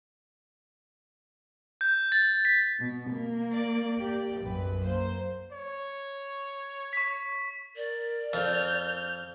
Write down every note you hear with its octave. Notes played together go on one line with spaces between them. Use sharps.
G6
A6
B6
B2
A#3
D5
G4 D5
B1 F#2 B4
A#3 C5
C#5
C#6 B6
A#4 D5
F2 F6 G6